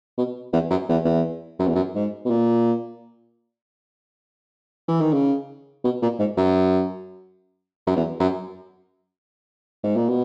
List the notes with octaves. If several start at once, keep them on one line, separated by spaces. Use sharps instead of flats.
B2
E2
F#2
E2
E2
F#2
E2
F#2
G#2
B2
A#2
E3
D#3
C#3
B2
A#2
G#2
F#2
F#2
E2
F#2
G#2
A#2
B2